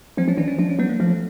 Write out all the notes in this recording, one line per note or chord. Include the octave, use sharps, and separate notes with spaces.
F3 C4
F3 C#4
E3 D4
C#4
F3 D4
C#4
F#3 B3
A#3
F3 A3